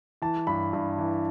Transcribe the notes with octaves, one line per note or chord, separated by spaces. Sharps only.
E3 A5
G2 B5
G2
E3